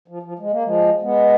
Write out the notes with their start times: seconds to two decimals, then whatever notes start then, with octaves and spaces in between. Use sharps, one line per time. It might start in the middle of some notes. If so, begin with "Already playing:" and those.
0.08 F3
0.23 F3
0.39 G#3
0.51 A#3
0.64 F3 G#3
1.02 G#3 B3